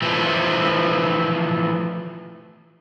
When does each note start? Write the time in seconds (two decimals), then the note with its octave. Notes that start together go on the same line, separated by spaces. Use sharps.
0.02 E3 F3 A3 C4